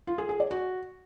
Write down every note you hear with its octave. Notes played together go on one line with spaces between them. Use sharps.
F4
G#4
G#4
D5
F#4